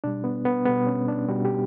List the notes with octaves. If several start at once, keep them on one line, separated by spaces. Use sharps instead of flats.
B2 G3 D4
B3
B3
B2 G3 B3
C#4
D4
B2 G3 F#4
G4